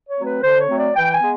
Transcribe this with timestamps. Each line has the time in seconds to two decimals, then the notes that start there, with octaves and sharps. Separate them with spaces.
0.08 C#5
0.18 F#3 A3 C4
0.25 B4
0.42 D3 C5
0.60 C#5
0.69 F#3 A3 C4
0.78 D5
0.95 E3 G5
1.12 G#5
1.21 G#3 B3